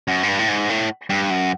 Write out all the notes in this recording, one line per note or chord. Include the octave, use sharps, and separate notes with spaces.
F#2
G#2
G2
A2
G#2
A2
G2
F#2